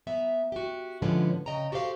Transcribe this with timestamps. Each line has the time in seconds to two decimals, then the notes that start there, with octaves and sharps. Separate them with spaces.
0.07 B3 E5 A#5
0.52 F#4 G4
1.02 A2 D3 F3 G#3 B3 C#4
1.46 C#3 D#5 G5 A#5
1.72 F#4 G4 A4 C5 F5